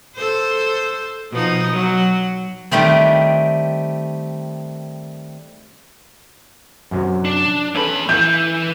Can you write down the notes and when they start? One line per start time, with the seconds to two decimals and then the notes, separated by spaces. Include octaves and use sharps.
0.16 A4 C5
1.31 B2 F3 D#4
1.71 F#3
2.71 D#3 G3 A3 C4
6.91 F#2 C3 F#3
7.25 D4
7.75 E2 C#4 A4 B4 B5
8.09 E3 E4 G6